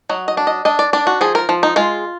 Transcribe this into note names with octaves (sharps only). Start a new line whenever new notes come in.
F#3 D#5
D#5
D4
D#5
D4 D#5
D5
D4 D5
F#4
F3 G#4
A#4
F3
D#4
G#3 F4